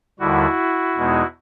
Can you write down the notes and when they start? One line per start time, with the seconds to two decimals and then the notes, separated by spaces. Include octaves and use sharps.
0.20 D#2 D3 G3 E4 F#4
0.96 E2 B2 G#3 B3 D#4